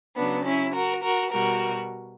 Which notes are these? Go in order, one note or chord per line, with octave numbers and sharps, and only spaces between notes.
C#3 F#3 B3 D4
C#4 E4
F#4 A#4
F#4 A#4
B2 G3 F#4 A#4